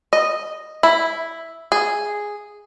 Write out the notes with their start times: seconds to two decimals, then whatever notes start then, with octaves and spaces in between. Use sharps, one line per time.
0.13 D#5
0.83 E4
1.72 G#4